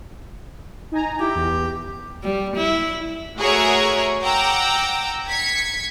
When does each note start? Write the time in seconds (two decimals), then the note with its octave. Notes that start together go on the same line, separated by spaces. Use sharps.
0.92 D#4 G#5 A#5
1.20 E4 G4
1.36 E2
2.23 G3
2.56 E4
3.38 A3 F#4 G#4 A#4 C#5 E5
4.22 F#5 G5 A#5 D6 E6
5.29 G#6 B6 C#7